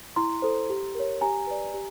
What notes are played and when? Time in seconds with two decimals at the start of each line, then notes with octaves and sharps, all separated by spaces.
0.16 E4 A#5 C6
0.42 A4 C5
0.70 G4
0.95 A#4 C#5
1.21 G4 G#5 A#5
1.47 B4 D5
1.74 G4